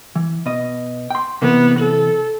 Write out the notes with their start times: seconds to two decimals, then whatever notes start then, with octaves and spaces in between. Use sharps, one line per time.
0.16 E3
0.46 B2 D#5
1.10 G5 C6
1.42 C3 E3 B3
1.79 A4